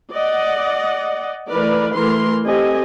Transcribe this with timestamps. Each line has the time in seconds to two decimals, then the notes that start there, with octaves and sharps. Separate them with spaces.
0.12 D5 D#5 F#5
1.49 E3 A3 A#4 B4 D5
1.93 E3 A3 A#4 C6
2.46 C4 G4 A4 D#5 G#5